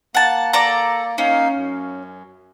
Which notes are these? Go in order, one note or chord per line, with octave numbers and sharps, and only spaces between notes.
A#3 F#5 A5
A4 D5 A#5
A#3 C#4 D#4 F5
F#2